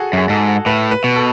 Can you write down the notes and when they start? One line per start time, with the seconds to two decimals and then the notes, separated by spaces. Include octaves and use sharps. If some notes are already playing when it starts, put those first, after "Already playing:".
Already playing: F#4 G#4 A4
0.13 F#2 G#4
0.29 G#2 A4
0.66 A2 B4
0.91 B4
1.04 B2
1.16 A4